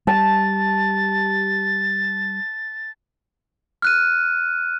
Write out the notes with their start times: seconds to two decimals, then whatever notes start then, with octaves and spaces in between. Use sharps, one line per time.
0.07 G3 A5 A6
3.82 F6 F#6 D#7